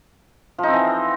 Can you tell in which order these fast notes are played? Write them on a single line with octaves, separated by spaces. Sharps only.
F3 D#4 C4 E3